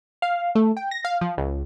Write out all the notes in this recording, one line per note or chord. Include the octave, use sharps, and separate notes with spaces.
F5
A3
G5
A#6
F5
F3
C#2